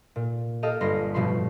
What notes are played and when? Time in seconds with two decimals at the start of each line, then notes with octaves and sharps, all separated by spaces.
0.16 A#2
0.62 G4 A4 D#5 F5
0.81 G1 B5 C6 A#6
1.14 A1 G2 B2 F3 B5 C6